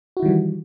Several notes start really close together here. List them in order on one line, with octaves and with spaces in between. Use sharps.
F#4 E4 D#3 G3 E3